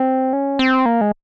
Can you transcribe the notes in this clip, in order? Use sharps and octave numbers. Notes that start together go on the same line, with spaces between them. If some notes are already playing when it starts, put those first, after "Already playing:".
Already playing: C4
C#4
C4
A#3
G#3